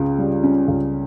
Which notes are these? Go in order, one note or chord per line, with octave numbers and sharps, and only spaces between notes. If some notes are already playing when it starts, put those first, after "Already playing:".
Already playing: C#2 C#3
G3
C#4
C#2